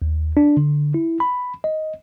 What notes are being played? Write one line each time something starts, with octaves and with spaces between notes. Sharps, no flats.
D#2
D4
D3
E4
B5
D#5